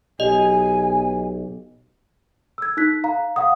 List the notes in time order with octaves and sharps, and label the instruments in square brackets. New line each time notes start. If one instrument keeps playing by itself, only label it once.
[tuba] B1 [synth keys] G4 [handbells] D#5 [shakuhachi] G#5
[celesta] E6 G#6
D#4 F#6 B6
F5 A#5
F5 F#5 D#6